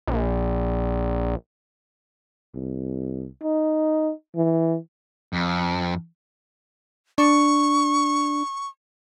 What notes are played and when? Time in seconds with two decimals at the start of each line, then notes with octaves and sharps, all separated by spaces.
0.07 A#1
2.54 C2
3.43 D#4
4.35 E3
5.33 F2
7.18 D4 C#6